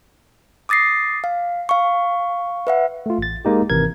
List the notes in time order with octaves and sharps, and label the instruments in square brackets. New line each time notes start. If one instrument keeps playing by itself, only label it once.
[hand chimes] D6 D#6 A6 A#6 C7
F5
F5 C#6
B4 E5 F#5
[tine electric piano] A3 F4
A1 A6
G#3 A#3 D#4 G4
G#1 C3 D#3 E3 A#4 G#6